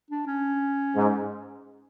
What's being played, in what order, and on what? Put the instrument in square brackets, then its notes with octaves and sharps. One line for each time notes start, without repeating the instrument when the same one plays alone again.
[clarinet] D4
C#4
[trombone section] G#2